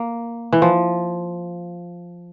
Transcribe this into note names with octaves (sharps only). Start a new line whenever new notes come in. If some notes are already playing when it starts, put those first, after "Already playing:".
Already playing: A#3
E3
F3